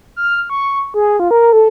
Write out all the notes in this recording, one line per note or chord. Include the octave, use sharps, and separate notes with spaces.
F6
C#6
G#4
F4
A#4
A4